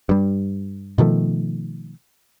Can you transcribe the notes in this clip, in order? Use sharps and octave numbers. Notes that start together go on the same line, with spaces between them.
G2 G3
B2 D#3 F3 A3